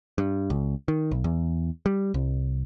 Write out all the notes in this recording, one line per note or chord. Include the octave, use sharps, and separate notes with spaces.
G2
C#2
D#3
B1
E2
G3
C2